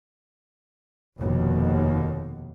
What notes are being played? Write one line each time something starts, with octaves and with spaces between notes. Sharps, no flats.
F1 D#2 B2